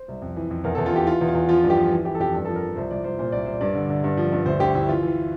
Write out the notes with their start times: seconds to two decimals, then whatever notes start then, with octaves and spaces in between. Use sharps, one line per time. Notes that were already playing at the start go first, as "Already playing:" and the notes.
Already playing: C5
0.08 C2
0.22 F2
0.36 E3
0.51 F2
0.64 E2 A#4
0.75 E2 A4
0.86 F4
0.92 E3 G4
1.07 E3 F4
1.21 E2
1.28 F4
1.35 E2
1.49 F3 F4
1.64 G2
1.70 G4
1.78 F3
1.92 E3
2.05 E3 G4
2.15 A4
2.20 F2 G4
2.34 G2 A4
2.45 F3 A4
2.56 A#4
2.62 F3
2.76 C2 C5
2.91 C2 D5
3.04 C2 C5
3.19 A#2 C5
3.32 C2 D5
3.45 C2 C5
3.61 G2 D5
3.75 D3
3.90 D3
4.04 G2
4.17 F3
4.32 G2
4.46 D2 C5
4.60 D2 G4
4.75 D2 E4
4.88 E3 F4
5.03 E3